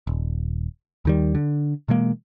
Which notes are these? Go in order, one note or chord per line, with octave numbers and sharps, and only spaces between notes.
D#1
D#2 D#3 G3
D3
B2 E3 G#3 A#3